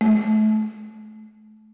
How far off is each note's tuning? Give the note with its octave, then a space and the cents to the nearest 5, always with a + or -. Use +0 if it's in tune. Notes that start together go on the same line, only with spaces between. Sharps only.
A3 -35